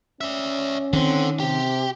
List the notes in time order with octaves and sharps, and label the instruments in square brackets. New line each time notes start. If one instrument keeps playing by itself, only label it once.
[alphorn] C#4 [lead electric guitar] D5 E5
[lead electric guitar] D3 [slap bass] D#3 [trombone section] C4
[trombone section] C3 [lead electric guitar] G4